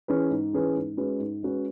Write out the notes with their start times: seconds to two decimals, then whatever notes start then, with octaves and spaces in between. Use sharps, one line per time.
0.08 E3 C#4 G#4 B4
0.31 G#2
0.53 E3 C#4 G#4 B4
0.75 G#2
0.97 G#3 C#4 F#4 B4
1.19 G#2
1.43 G#3 C#4 F#4 B4